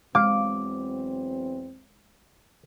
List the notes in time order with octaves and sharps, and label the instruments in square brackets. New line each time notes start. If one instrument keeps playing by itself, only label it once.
[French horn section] E2 F#3 C4 [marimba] G#3 [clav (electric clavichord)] F5 [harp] D6